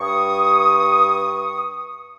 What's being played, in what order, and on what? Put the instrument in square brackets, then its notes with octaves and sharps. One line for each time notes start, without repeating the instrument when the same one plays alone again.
[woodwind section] G2 C#6 D#6